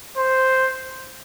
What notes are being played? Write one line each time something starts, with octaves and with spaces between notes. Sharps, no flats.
C5